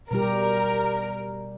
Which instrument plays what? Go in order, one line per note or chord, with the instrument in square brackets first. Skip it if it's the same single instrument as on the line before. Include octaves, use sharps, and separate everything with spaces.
[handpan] B2 G3 G4 [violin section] A#4